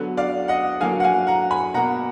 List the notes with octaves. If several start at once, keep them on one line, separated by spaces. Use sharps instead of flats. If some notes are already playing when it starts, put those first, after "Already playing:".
Already playing: D3 F#3 B3
D5 F5
D#5 F#5
D3 F#3 A#3 F5 G#5
F#5
F5 G#5
F#5 A#5
G#5 B5
B2 A#3 F#5 A#5